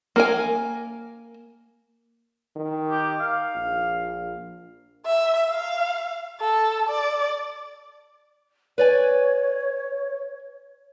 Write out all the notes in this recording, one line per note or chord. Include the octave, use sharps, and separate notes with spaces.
A#3 A#4 G#5
D#3
G4
F5
A#1
E5
F5
A4
D5
B4 C#5 D5 G#5